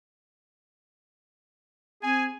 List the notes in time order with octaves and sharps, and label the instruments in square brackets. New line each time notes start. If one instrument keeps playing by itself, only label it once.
[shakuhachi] C4 [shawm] G#4 [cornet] G#5